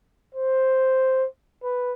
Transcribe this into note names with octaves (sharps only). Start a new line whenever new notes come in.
C5
B4